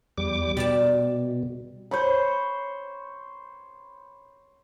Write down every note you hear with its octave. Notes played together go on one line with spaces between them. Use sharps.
E2 G3 D6
B2 G3 D5 A5
C5 C#5 B5